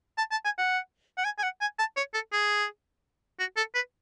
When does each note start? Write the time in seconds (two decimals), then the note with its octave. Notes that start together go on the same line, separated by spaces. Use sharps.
0.18 A5
0.31 A5
0.45 G#5
0.58 F#5
1.17 F#5
1.24 G#5
1.38 G#5
1.43 F#5
1.61 G#5
1.79 A5
1.97 C#5
2.14 A4
2.33 G#4
3.39 F#4
3.57 A4
3.75 B4